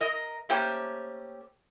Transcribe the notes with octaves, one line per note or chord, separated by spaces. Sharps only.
A#4 D#5
A3 A#3 C#4 G4 C5 G5